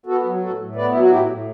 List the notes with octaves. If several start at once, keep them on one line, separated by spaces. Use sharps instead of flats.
B3 F#4 A4
F#3
A2 F#4 A4
A2
B3 B4 D5
F#3 E4
F#4
A2 E4 G4
A2